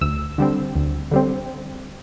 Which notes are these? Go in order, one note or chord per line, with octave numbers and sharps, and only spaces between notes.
D2 E6
D3 G3 C4
D2
D3 G3 C4